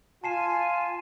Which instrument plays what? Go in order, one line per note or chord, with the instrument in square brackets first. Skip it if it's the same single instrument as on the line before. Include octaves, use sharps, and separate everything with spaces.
[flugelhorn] F4 [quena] G#5 [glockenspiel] A5 C7 E7